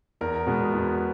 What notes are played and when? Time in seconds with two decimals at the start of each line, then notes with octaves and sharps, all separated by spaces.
0.21 E2 A#4
0.47 B2 G#3 B3
0.73 E2